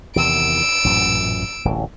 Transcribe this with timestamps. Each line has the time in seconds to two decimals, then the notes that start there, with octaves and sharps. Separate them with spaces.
0.16 E2 C3 D#3 E6 D7
0.84 A1 F#2 A#2
1.65 D1 A1